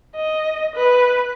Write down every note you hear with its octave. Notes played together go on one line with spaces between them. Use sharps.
D#5
B4